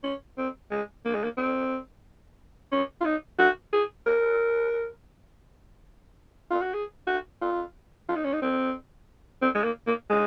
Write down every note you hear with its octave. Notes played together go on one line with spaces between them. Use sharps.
C#4
C4
G#3
A#3
G#3
A#3
C4
C#4
F4
D#4
F#4
G#4
A#4
F4
F#4
G#4
F#4
F4
F4
D#4
C#4
D#4
C4
C4
G#3
A#3
A#3
G#3